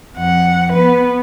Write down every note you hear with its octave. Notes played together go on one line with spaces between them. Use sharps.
F2 F#5
B3 B4